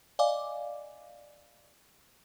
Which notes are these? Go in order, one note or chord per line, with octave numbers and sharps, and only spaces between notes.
D5 D#5 F5 G#5 D6